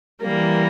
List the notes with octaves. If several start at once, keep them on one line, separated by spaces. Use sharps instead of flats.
E3 G3 A#3 A#4